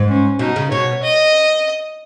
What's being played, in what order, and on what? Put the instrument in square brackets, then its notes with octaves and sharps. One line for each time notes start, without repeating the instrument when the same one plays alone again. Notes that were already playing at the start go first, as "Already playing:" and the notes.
Already playing: [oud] G#2
[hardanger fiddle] C#4
[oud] B2 [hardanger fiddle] D#4
[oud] C#3
[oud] B2 [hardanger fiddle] C#5
[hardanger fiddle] D#5